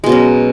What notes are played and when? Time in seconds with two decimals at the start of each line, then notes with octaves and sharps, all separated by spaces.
0.04 G#3
0.06 B2
0.09 F#3
0.12 C#4